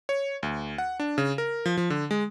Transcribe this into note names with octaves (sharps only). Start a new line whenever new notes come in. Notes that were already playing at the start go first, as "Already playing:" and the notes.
C#5
D2
F#5
D4
C#3
A#4
F3
F3
D3
G#3